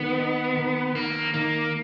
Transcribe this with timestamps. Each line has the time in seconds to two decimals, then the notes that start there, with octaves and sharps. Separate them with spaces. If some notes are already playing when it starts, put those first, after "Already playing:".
Already playing: D#3 B3
0.19 D#4
0.57 D#3
0.95 D#3 A#3
1.34 D#3 A#3